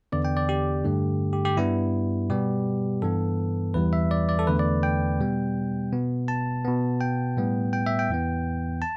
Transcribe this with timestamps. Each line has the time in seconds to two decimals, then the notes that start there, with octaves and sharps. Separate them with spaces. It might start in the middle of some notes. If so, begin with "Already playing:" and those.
0.12 E2 D3 B3 D5
0.25 G5
0.37 D5
0.49 G4
0.85 G2 D3 A3
1.33 G4
1.45 G4
1.57 G2 G3 B3 E4
2.30 B2 G3 B3 G4
3.02 G2 E3 B3 A4
3.74 E2 E3 G3 B4
3.93 E5
4.11 D5
4.29 D5
4.39 A4
4.47 E2 D3 A3 B4
4.59 D5
4.83 G5
5.20 B2 G3 B3
5.92 B2 B3
6.28 A5
6.65 B2 B3
7.01 G5
7.37 A2 G3 B3
7.73 G5
7.86 E5
7.99 G5
8.09 E2 E3 B3
8.82 A5